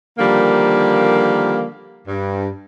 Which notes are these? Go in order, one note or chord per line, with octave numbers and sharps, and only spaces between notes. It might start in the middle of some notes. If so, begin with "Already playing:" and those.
D3 D#3 F3 G3 A#3
G2